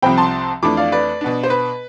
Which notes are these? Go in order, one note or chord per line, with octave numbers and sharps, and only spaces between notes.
C2 C3 F3 C4 G5 B5
A5 C6
F2 E3 A3 D4 B5 D6
D5 F5
B4 D5
B2 B3 D4
C5
B4